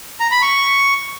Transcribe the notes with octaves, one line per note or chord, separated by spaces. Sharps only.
A#5
B5
C#6